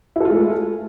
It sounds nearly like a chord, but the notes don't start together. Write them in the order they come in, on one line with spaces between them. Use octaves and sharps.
E4 A4 F4 G#3 A3